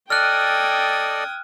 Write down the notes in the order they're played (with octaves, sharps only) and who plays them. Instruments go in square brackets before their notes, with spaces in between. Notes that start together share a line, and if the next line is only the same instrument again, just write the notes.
[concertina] A4 D5 D#5 [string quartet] G5 D#6 G#6 [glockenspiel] F6 F#6